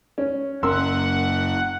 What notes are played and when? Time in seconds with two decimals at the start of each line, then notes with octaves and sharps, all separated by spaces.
0.18 C#4
0.63 F#1 C#4 A#4 F#5 C6 E6